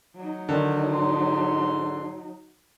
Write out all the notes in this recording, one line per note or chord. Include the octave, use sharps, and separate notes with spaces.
F#3 D#4
D3 D#3
G#2 C6